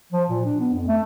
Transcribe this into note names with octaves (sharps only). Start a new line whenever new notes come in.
F3
A#2
D4
B3
F2
A3